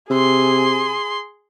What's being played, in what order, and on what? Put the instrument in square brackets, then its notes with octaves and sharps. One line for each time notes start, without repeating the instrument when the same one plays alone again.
[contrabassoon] C3 [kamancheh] G#4 C6